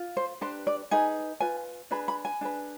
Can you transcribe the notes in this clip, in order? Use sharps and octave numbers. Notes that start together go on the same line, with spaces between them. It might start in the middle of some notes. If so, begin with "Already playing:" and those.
Already playing: F4
C5
D4 G4 B4 C5
D5
D#4 G#4 B4 G#5
F4 B4 G#5
D4 G#4 B4 B5
B5
G#5
D4 G#4 B4